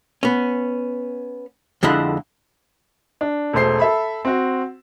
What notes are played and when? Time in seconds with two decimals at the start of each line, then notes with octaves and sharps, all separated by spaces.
0.23 B3 C#4
1.83 F2 D3 G#3 E4 F#5
3.21 D4
3.53 E1 A3 C5 C7
3.79 A4 E5 B5
4.25 C4 F#4